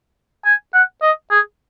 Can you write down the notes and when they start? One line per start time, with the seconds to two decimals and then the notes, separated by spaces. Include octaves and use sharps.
0.45 G#5
0.74 F#5
1.02 D#5
1.31 G#4